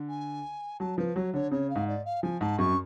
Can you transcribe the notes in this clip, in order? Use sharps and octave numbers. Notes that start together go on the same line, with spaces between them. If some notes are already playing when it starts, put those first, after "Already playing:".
Already playing: D3
G#5
F#3 A5
F3 B4
F#3 C#5
D3 C#5
C#3 C#5
F5
G#2
D5
F5
F3 G#5
G#2 A5
F#2 C#6